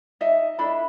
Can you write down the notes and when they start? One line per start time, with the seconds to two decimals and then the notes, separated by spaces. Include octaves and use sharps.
0.21 D#4 D#5 E5
0.59 D4 E4 A4 B5